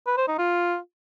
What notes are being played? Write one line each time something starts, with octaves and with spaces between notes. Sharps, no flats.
B4
C5
D#4
F4